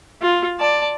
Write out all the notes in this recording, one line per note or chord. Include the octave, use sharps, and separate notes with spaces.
F4
D5 A5